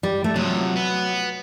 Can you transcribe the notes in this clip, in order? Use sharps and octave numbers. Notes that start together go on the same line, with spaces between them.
G3
A3
C3 F3 F#3
B3